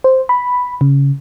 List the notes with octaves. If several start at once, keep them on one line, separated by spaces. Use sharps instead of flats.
C5
B5
C#3